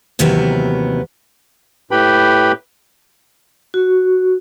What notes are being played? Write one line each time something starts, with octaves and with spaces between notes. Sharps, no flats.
D#2 C3 E3 F#3 B3 A#4
A2 G4 B4 G5 B5
F#4